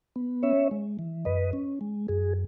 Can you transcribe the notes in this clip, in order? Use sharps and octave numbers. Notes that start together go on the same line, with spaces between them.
B3
C#4 C#5 E5
G#3
E3
F#2 B4 D#5
C#4
G#3
F#2 G#4